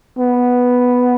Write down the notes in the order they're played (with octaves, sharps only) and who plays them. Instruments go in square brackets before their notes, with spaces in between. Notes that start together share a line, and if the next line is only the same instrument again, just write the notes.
[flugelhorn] B3